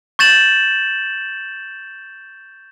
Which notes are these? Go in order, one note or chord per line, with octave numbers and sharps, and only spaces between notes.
C#6 G6 A6 E7 F#7